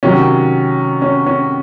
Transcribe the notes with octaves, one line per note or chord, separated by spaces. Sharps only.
C3 D#3 F#3 C#4
C#4
C#4